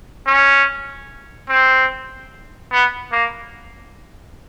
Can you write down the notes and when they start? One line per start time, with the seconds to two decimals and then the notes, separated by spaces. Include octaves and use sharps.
0.27 C#4
1.49 C4
2.72 B3
3.12 A#3